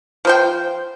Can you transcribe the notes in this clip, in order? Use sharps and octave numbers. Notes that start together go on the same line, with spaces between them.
F3 C5 G5